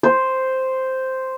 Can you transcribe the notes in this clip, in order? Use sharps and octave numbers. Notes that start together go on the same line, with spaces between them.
C5